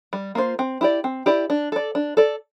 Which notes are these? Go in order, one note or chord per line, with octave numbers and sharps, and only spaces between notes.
G3
A#3 F4 C5
C4
E4 G4 D5
C4
E4 G4 D5
D4
A4 D5
D4
A4 D5